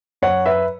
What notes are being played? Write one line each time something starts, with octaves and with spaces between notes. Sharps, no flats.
F#2 C#5 F#5
B4 E5